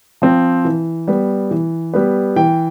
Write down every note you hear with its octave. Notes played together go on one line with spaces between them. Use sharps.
F3 C4
E3
G3 B3
E3
G3 B3
E3 G5